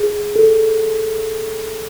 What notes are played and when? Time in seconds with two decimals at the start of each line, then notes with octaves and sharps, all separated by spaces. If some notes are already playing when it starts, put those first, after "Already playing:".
Already playing: G#4
0.36 A4